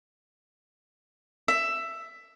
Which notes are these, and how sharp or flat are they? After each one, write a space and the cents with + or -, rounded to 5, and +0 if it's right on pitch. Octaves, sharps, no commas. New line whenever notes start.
E5 +10